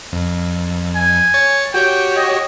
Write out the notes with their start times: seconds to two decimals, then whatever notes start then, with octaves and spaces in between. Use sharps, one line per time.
0.13 F2
0.96 G#5
1.34 C#5 A6 C#7
1.74 F#4 G4 C#5 G5
2.16 D#5